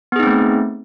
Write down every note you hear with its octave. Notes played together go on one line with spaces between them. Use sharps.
A3 B3 C4 D#4 G#4